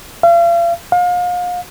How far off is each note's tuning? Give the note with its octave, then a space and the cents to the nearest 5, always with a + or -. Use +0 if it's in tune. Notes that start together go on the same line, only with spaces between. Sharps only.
F5 -40
F5 +35